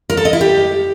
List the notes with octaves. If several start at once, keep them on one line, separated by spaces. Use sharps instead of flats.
A#4
A4
D#5
E4
G4